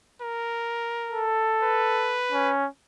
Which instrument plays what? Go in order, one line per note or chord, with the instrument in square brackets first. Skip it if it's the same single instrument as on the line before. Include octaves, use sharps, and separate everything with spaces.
[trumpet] A#4
[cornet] A4
[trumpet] B4
[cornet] C#4